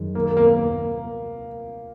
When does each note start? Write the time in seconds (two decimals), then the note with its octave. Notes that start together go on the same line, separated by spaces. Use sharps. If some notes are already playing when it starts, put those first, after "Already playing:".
Already playing: F#2 D#3 G#3
0.15 A#3
0.25 A#3
0.37 A#3
0.47 A#3